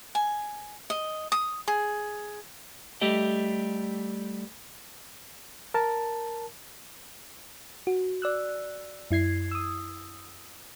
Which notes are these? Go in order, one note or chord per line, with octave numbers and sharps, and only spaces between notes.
G#5
D#5
D#6
G#4
G3 A3 G4 D#5
A#4 A5
F#4
D5 E6 F#6
F#2 E4 G#6 C7
D#6 E6